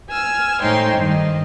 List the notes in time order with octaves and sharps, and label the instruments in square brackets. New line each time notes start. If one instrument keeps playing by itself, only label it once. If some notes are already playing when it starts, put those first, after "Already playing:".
[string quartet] G#5 E6 F6
A2 D#4 C5 C#5 G5 C6
G2 D#3 D#5